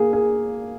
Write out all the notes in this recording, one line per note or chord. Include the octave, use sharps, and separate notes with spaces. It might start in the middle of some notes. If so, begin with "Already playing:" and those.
Already playing: A#3 D4 G#4
G#4